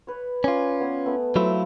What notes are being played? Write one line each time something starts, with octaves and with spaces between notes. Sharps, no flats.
B4 C#5
C#4 F4 D5 G#5 D#6
B3 C#5 D#6
A3 B3
F#3 A3 E4 F4 A4 C5